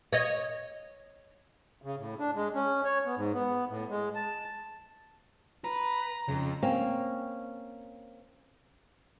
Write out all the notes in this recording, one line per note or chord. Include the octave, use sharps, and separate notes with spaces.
C#5 D#5
C#3
A2
D4
G#3
C#4
C#5
B3
G#2
B3
A2
G#3
A5
B4 A#5
F2 C#3
A#3 C4 C#4